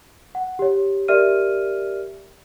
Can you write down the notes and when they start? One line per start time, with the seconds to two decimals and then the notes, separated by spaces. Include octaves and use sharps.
0.35 F#5
0.59 G4 C#5
1.08 G4 A#4 D5 E5 F6 D#7